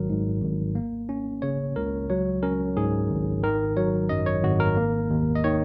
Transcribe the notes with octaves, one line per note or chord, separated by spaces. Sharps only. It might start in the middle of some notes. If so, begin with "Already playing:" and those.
Already playing: G#1 F#3 A#4
G#2
G#1
A#3
C#4
C#3 C#5
C#2 A#4
F#3 C#5
C#4 A#4
G#2 G#4
G#1
D#3 A#4
F#3 C#5
F#2 D#5
C#5
G#1 F#4
A#4
A#3
D#2
D#5
D#3 C#5